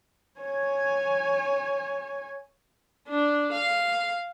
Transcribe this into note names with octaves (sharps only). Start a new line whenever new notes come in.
C#5 G#5
D4
F5